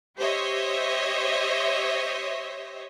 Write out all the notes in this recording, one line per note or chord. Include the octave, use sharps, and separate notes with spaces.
G4 C5 C#5 D#5 E5